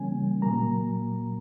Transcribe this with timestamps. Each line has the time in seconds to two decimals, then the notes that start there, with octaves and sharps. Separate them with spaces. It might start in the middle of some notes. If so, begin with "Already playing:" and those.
Already playing: C#3 E3 G3 A#3 C#4 G#5
0.42 A#2 F#3 A#3 A#5